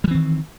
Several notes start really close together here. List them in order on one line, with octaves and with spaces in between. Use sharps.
G3 E3 C4 D#3